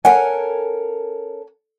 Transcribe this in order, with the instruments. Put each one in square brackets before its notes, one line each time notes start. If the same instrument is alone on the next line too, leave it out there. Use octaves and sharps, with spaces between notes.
[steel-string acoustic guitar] C#4 A4 A#4 [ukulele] F#5 G#5